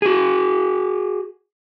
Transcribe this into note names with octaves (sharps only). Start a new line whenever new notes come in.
F#4 G#4